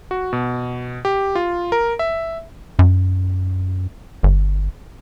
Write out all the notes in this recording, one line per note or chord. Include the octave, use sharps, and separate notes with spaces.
F#4
B2
G4
F4
A#4
E5
F#2
G1